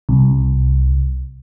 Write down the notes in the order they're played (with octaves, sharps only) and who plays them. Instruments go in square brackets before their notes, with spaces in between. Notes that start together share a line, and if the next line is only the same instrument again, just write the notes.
[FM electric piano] C2